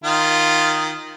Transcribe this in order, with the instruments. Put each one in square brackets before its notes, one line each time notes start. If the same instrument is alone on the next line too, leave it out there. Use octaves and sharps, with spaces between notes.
[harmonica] D#3 F4